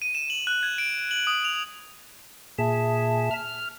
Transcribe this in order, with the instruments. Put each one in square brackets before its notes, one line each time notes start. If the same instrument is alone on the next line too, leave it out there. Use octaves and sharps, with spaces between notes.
[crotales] D#7
E7
F#7
F#6
G#6
D7
F#7
D#6
F7
[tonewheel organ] A#2 G#4 [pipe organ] E5 A5
[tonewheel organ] F6